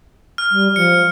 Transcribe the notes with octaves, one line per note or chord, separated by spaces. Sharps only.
F6
G3
F3 C#7